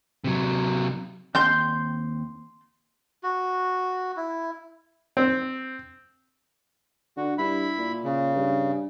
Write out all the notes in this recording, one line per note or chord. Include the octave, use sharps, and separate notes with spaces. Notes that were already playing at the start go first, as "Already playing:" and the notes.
C3 F#3
D#2 C4 G5 C6 G6
F#4
E4
C4
D3 F#4
G2 E4 B5
A#2
C#3
G2